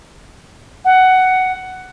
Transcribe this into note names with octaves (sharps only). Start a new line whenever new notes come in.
F#5